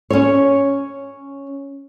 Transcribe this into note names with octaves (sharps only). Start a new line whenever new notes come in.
C#4 C#5